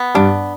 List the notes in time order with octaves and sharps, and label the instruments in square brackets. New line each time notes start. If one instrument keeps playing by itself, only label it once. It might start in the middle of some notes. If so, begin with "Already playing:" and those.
Already playing: [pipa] B3
[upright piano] G2 [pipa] D4